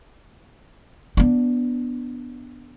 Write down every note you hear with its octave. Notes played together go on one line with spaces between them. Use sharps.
B3 D4